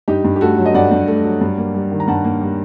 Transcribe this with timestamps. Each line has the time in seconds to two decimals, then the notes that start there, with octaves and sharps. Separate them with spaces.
0.08 G2 D#4 G4
0.25 G2
0.36 G4
0.41 A3 F#4 A4
0.57 F#3
0.66 D#5
0.74 G2 D5 F#5
0.92 G2
1.08 A3
1.24 F#3
1.41 G2
1.58 A#3
1.74 G3
1.92 D#3
2.00 A#5
2.08 G2 F#5 A5
2.25 A#3
2.41 G3